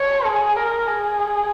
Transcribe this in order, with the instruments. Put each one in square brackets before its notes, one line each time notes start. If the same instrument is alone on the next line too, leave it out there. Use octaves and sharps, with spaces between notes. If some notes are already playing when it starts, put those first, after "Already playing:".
Already playing: [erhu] C#5
G#4
A#4
G#4